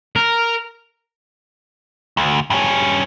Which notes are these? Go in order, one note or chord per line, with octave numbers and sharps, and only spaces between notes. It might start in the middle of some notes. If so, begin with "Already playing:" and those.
A#4
D2
G2 C#4